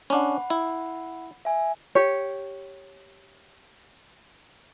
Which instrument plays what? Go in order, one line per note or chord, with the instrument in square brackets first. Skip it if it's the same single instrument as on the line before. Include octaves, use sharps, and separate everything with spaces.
[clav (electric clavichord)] C#4 D4 [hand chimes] F#5 B5
[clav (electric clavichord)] E4
[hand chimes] E5 G#5
[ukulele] G4 C#5